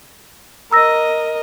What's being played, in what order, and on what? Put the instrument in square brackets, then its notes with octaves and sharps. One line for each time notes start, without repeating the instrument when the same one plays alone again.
[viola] A#4 D#5 [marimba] A#5 E6 A#6